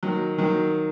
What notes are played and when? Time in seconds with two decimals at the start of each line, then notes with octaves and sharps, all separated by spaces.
0.03 D#3 F#3
0.38 D#3 F#3